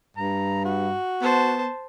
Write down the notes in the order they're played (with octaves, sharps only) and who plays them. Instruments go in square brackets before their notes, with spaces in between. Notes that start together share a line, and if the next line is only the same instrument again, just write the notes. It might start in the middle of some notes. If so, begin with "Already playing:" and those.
[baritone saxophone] G2 [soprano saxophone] A#5
[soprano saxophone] F#4
[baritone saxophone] B3 [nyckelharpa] C5 A5